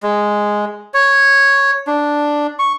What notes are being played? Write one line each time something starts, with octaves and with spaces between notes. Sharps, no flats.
G#3
C#5
D4
C#6